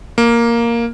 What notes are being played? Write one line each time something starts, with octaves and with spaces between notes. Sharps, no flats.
A#3